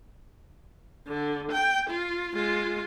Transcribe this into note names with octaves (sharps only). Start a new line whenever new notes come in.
D3
G5
F4
G#3 F4